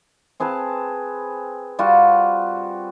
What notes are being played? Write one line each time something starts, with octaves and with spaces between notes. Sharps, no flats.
C4 G#4 B4 A5
G3 F4 F#4